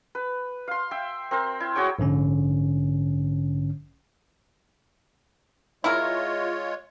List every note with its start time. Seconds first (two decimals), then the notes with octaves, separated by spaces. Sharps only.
0.15 B4
0.68 F5 C6
0.91 E5 G5
1.31 C4 A#4 C5
1.60 E4
1.75 F#4 G#4 C#5 G5
1.99 A#1 G#2 D3 C#4
5.84 G#3 E4 F4 A#4 C#5